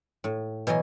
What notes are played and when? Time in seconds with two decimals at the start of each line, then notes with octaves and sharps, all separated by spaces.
0.24 A2
0.67 B2 E3 F#3 D#5 G#5